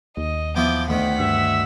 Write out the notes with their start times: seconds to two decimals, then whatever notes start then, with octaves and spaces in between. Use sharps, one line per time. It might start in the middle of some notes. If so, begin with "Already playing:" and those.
0.17 D#2 D#5
0.56 E3 F3 B3 D6 G6
0.88 D2 D#3 F#5 B6
1.19 G2 E5